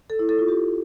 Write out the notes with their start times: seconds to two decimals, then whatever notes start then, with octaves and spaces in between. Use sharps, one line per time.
0.10 A4
0.19 E4
0.29 A4
0.39 F4
0.48 G4